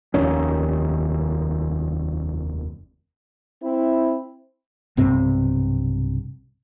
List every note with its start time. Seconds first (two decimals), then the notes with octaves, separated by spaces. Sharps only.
0.14 F1 D#2 D#3 C#4
3.63 C4 E4
4.97 B1 G2 C3 C4